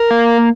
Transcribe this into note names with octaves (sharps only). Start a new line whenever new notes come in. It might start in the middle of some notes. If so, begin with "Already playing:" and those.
Already playing: A#4
A#3